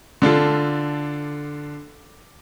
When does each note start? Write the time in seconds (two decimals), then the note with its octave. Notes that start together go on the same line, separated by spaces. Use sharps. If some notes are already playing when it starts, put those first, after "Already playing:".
0.22 D3 D4 F4 A4